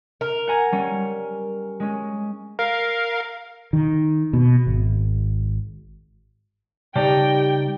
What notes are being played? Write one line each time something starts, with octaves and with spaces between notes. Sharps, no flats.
A#4
F#5 G#5 A#5
G3 C#4
G#3 C#4
A#4 F5
D#3
B2
G#1
C#3 G3 D#4 G4 D5 G5 A5